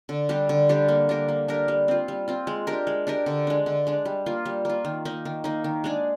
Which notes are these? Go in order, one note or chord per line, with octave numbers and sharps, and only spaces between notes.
D3
G3 D4 G4
D3
G3 D4 G4
A#3
D4 G4 A#4
A#3
D4 G4 A#4
G3
C4 F4
G3
C4 F4
G#3
D4 G4 A#4
G#3
D4 G4 A#4
D3
G#3 D4
D3
G#3 D4
G3
A#3 F4
G3
A#3 F4
D#3
A#3 D#4
D#3
A#3 D#4
D#3
G#3 D4 G#4